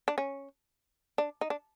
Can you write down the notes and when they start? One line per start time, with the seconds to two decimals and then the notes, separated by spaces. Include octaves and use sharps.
0.08 D4
0.18 C#4
1.18 D4
1.41 D#4
1.50 D4